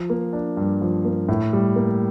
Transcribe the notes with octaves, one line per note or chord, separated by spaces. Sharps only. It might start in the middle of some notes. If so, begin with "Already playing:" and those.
Already playing: F3
A#3
D4
G2
F3
A#3
A2
G3
A#3